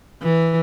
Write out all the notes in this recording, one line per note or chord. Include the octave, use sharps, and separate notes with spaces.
E3